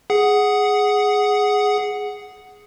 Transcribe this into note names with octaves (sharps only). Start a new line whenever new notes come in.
G#4 F#5